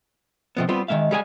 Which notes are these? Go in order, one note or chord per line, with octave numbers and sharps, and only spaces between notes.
C3 F3 B3
G3 B3 C4 F4
D#3 E3 G#3 E5 F5
G3 G#3 G#4 F5 G5 G#5